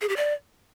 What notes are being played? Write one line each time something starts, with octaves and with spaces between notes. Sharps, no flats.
G#4
G4
D5